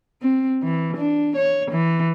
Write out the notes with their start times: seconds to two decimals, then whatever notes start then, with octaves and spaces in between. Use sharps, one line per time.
0.22 C4
0.63 E3
0.97 D4
1.36 C#5
1.71 E3